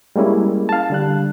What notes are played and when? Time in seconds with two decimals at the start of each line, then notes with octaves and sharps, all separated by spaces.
0.16 G3 G#3 A#3 C#4 E4
0.69 F5 A5
0.90 D3 G3 F#6